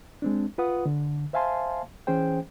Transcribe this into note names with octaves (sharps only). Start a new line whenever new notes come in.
G#3 C4 D4
F4 B4 F#5 D#6
D3
C5 E5 F5 G#5 A5 C6
E3 C#4 G#4 C5 G5